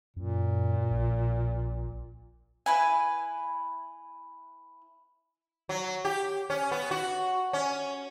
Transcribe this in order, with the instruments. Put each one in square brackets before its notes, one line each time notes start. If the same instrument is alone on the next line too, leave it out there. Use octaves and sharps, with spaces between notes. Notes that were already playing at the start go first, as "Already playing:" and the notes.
[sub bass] F#2 [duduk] A#2
[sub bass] A#1
[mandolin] E4 B4 G#5
[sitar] F#3
G4
C#4
B3
F#4
C#4